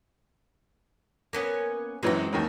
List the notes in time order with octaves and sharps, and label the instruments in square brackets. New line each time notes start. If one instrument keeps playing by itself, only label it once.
[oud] A#3 B3 C#4
[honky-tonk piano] F#2 E3 F#3 [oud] G#3 C4
[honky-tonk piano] D#2 D#3 F#3